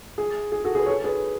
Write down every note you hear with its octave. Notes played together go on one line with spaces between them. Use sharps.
G#4
G#4
F#4 A4
G#4 B4
A4 C#5
G#4 B4